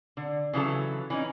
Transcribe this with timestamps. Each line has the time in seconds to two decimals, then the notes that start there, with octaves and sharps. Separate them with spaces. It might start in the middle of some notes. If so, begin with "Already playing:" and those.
0.17 D3
0.53 C#3 E3 F#3 A4
1.10 E3 C#4 D#4